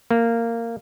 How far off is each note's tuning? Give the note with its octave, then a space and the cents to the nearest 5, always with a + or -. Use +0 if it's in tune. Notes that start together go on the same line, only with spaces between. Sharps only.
A#3 -15